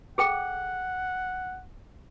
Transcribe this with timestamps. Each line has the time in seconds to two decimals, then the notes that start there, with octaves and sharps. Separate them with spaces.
0.18 G#4 A4 F#5 G5